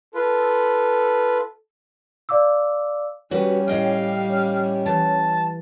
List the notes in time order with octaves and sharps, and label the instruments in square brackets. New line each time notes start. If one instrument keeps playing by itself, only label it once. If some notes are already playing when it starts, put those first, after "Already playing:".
[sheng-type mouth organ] F4 B4 [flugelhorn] A4
[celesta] D5 F5 D6 E6
[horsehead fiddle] G3 [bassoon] C#4 [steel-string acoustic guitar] F#4 B4
[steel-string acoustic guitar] A2 D#5 G5 [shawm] F5
[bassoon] C#4
[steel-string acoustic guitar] E3 [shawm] A5